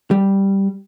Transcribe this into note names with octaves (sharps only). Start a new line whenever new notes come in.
G3